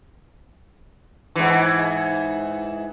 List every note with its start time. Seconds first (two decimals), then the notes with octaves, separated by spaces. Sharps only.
1.35 G#2 E3